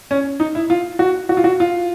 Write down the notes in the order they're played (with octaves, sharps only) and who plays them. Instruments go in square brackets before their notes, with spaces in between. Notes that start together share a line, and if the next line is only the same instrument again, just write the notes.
[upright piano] C#4
D#4
E4
F4
F#4
F#4
F4
F#4
F4